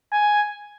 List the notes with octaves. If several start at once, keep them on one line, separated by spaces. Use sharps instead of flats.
G#5